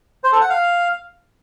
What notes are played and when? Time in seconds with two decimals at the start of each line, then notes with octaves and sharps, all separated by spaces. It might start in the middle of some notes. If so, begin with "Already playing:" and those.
0.24 C5
0.32 A4
0.41 F#5
0.50 F5